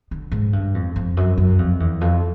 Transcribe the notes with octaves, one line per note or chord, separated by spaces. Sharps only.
D3
G#2
G2
F2
F2
F#2
F#2
F2
E2
F2